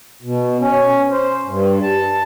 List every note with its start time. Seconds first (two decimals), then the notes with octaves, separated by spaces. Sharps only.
0.22 B2
0.60 C#4
1.11 C5
1.46 G2
1.82 A5